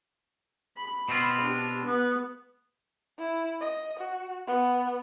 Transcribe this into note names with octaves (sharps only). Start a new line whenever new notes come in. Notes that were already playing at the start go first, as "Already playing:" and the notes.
B5
B2 C4 F4
D4 G4
B3
E4
D#5
F#4
B3